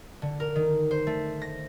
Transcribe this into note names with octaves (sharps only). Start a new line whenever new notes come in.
D3
A#4
D#3
C5
A3
A#6